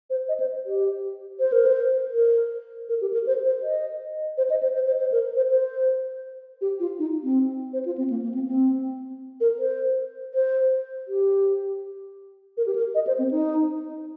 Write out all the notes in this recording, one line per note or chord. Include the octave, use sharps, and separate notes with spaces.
C5
D#5
C5
G4
C5
A#4
C5
A#4
A#4
G4
A#4
C5
C5
D#5
C5
D#5
C5
C5
C5
C5
A#4
C5
C5
G4
F4
D#4
C4
C5
F4
C4
A#3
A#3
C4
C4
A#4
C5
C5
G4
A#4
G4
A#4
D#5
C5
C4
D#4